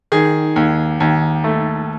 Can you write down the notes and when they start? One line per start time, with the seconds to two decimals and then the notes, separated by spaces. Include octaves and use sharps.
0.12 D#3 G#4
0.56 D#2
1.00 D#2
1.44 A3